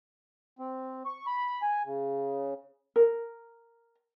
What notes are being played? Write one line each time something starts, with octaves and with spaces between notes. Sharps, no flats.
C4
C#6
B5
G#5
C#3
A#4